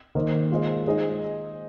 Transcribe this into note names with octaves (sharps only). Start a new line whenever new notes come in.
D#3 A#3 D#4 C5 D#5
G#3 F4 G#4 C5 D#5
G#3 D#4 G#4 C5 D#5